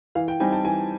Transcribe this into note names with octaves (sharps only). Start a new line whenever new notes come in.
E3 F5
G5
G3 C4 D#4 G#5
A5
E3 G#5